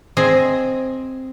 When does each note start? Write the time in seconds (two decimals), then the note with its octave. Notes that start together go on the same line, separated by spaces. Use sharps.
0.17 C4 G#4 D#5